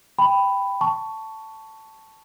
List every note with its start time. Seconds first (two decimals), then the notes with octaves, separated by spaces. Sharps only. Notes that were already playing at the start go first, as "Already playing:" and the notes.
0.18 G5 B5
0.81 A5 C#6